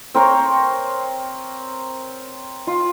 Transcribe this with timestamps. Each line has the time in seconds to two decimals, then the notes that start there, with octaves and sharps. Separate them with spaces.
0.15 C4 A#4 C#5 A#5
2.67 F4